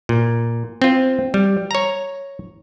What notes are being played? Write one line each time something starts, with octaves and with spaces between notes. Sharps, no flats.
A#2
C4 F4
G3
C#5 A#5